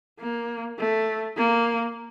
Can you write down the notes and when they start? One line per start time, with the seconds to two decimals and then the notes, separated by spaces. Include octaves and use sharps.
0.20 A#3
0.79 A3
1.37 A#3